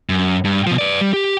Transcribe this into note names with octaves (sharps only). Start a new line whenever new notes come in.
F#2
G2
B2 F3
B4 D5
G3
G4